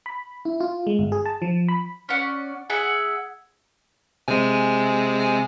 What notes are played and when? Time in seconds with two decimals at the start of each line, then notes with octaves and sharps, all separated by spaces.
0.06 B5
0.45 E4
0.60 F4
0.87 G#3
0.99 G1
1.12 G#4
1.26 A5
1.42 F3
1.68 B5
2.09 C#4 D5 F#5
2.70 G#4 E5 F#5
4.28 C3 G#3 G#5
5.20 G#5